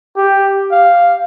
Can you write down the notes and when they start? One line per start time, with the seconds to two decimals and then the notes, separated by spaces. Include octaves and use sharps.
0.16 G4
0.71 F5